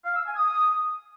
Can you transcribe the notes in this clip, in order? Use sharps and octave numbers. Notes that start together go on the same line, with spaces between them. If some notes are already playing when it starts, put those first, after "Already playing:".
F5
E6
G#5
D#6